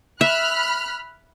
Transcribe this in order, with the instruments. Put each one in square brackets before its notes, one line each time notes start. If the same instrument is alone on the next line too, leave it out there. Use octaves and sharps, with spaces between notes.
[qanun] E5 [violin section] B5 F6 F#6